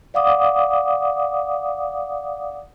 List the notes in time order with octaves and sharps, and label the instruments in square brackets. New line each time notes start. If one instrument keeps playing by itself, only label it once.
[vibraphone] D5 F5 F#5 D6 D#6